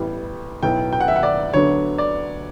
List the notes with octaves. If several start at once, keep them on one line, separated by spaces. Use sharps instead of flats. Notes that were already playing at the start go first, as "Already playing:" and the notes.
Already playing: A1 A2 G3 B3
B1 A2 F#3 B3 G5
G5
F#5
E5
F#5
D5
D2 D3 F#3 B3 D4 C#5
D5